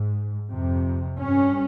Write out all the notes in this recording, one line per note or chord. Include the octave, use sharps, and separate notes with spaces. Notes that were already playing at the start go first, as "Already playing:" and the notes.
Already playing: G#2
F2 C3
G2 C#4